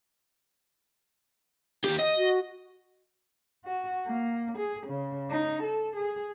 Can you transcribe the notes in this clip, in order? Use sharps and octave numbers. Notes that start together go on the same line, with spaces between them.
D#2 G4
D#5
F#4
F#4
A#3
G#4
C#3
D#4
A4
G#4